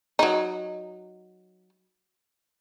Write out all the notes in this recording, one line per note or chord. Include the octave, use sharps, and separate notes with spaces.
F#3 D#4